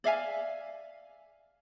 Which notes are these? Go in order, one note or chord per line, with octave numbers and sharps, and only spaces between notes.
D5 E5 F5 G#5